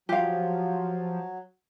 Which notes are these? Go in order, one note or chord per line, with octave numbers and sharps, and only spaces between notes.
F3 F#3 G4 F5